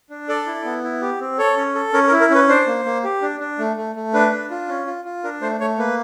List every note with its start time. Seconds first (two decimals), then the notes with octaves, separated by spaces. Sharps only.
0.10 D4
0.29 A4 D5
0.46 E4
0.64 B3
0.83 E4
1.02 G4
1.20 C4
1.38 A4 C#5
1.56 C#4
1.75 A4
1.93 C#4 A#4
2.07 A#4
2.11 E4
2.21 A#4
2.30 C#4 B4
2.49 D4 C5
2.67 A#3
2.85 A#3
3.04 G4
3.22 D4
3.40 D4
3.59 A3
3.77 A3
3.96 A3
4.14 D4 B4
4.32 D4
4.50 F4
4.68 C#4
4.87 F4
5.05 F4
5.24 D4 A#4
5.41 A3 C5
5.60 A3 C#5
5.79 A#3 B4